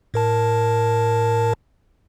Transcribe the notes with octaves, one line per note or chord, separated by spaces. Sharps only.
A2 A#4 A5